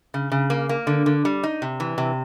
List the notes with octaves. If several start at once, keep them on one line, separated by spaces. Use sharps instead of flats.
C#3
C#3
A#3
A#3
D3
D3
G3
D#4
C3
E3
C3